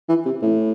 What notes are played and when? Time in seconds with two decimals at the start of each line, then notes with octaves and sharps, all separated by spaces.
0.09 E3
0.25 C3
0.42 A2